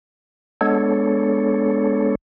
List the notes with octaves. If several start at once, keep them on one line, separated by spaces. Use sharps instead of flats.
G#3 B3 D4 A4 C#5